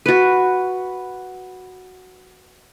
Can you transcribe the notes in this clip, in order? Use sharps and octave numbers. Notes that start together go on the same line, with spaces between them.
F#4 B4